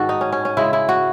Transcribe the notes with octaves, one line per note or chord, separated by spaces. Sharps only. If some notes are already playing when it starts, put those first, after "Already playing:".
Already playing: G#2 D#3 F#4 A4
D#4
C#4
C#4
C#4
C#3 G#3 E4
E4
F#4